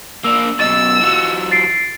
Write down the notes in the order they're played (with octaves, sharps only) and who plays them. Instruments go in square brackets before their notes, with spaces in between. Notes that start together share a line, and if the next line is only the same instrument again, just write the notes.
[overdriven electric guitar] A#3 D4 [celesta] E6
[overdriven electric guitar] F#2 B2 [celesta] D#5 A6 [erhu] E6
[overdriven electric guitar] E3 F#3
[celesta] A6 C7 D7